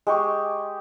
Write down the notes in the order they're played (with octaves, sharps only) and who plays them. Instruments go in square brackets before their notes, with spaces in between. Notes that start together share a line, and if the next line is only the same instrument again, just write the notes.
[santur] G#3 G4 G#5 C#6